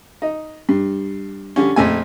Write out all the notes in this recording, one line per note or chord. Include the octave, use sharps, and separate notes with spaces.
D#4
G2
D3 G3 C#4
A#1 F2 A3 G#5